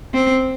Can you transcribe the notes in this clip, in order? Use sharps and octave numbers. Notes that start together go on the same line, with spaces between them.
C4